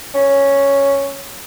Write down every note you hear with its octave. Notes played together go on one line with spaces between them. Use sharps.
C#4